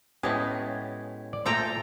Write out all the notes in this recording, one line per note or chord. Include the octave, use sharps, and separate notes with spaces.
A2 G#3 B3 C#4 G4
D5
A#2 A3 A4 C5 G5 A#5